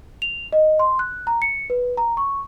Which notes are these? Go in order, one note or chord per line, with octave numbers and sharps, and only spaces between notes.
F7
D#5
C6
F#6
A#5
C#7
B4
A#5
C#6